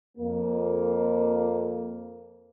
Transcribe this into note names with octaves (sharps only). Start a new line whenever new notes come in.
F2 A#3